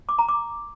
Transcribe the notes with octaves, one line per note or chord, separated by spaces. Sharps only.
D6
A#5
D6